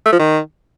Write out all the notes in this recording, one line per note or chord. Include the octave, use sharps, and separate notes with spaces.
A3
F3
D#3